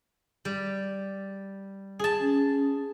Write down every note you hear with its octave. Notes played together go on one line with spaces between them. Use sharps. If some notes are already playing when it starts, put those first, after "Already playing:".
G3
G#4 A5
C#4